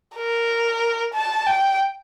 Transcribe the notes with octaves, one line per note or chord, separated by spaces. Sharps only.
A#4
A5
G5